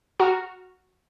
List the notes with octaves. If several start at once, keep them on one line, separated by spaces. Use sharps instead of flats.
F#4 F#5 A#5 F6